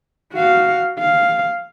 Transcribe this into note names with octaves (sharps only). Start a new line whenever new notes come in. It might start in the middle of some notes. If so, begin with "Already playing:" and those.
F#4 F5
F5